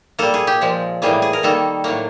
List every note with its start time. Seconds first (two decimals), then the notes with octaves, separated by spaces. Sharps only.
0.19 A#2 G3 A#3 A4
0.34 G#4
0.47 G4
0.61 A#2 F3 G#3
1.02 A2 E3 G3 A#3 G#4
1.22 G#4
1.33 A#4
1.43 D#3 G3 A#3 A4
1.84 A2 F#3 A#3